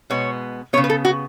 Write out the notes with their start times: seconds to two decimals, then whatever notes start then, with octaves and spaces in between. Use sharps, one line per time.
0.10 B2 G#3 B3 C#5
0.73 C#3 E3 B3 C#5
0.84 B4
0.90 A4
1.05 F#4